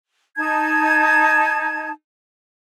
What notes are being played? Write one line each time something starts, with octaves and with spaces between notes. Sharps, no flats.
D#4 A5 G#6